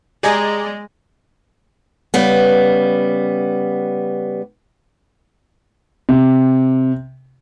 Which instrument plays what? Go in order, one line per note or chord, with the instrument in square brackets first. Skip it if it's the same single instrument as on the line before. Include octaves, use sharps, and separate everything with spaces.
[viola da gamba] G#3 [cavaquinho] G4 G#5 A#5 [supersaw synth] G#4 D5 D#5
[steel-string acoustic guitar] C#3 G3 B3
[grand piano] C3